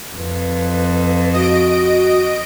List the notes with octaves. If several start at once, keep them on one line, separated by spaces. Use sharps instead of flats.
F2 B4
F#4 D#5 D7